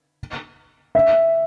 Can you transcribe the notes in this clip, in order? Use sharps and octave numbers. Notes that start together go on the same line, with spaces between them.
E5